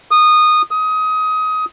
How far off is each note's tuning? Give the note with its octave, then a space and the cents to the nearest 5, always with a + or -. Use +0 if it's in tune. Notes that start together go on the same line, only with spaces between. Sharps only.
D#6 -15
D#6 +20